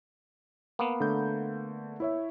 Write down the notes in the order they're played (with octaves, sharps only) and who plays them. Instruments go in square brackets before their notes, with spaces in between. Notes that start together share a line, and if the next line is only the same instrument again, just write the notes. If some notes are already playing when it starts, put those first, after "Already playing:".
[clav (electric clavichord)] A#3 B3
[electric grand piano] D3 A3 G6
E4 C#5 E5